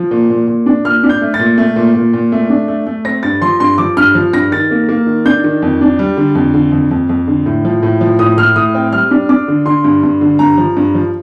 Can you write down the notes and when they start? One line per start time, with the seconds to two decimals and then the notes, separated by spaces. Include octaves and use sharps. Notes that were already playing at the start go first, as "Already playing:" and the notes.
Already playing: F3
0.11 A#2
0.30 A#2
0.47 A#2
0.66 D4
0.85 A#2 F6
1.03 D4
1.09 G6
1.21 A3
1.34 A6
1.39 A#2
1.58 A3
1.76 A#2
1.95 A#2
2.14 A#2
2.32 A3
2.50 D4
2.68 A3
2.87 A3
3.05 C4 A#6
3.23 G2 A6
3.42 F3 C6
3.60 G2 C6
3.78 F3 D6
3.97 G2 F6
4.15 F3
4.33 G2 A#6
4.52 D#3 A6
4.71 A#3
4.89 A#3
5.07 D#3
5.25 D4 G6
5.44 D#3
5.62 F2
5.81 D4
5.99 G3
6.17 D3
6.35 F2
6.54 D3
6.72 F2
6.91 F2
7.09 F2
7.27 D3
7.46 A2
7.65 F3
7.83 A2
8.01 F3
8.19 A2 D#6
8.37 A2 F6
8.56 A2 D#6
8.74 C4 G5
8.92 G3 F6
9.11 D4
9.29 D4 D6
9.48 D3
9.66 D3 C6
9.84 G2
10.03 G2
10.21 D3
10.39 G2 A#5
10.58 F3
10.77 G2
10.95 F3